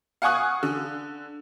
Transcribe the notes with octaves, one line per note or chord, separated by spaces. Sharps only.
F5 F#5 G#5 C#6 D#6 F#6
D3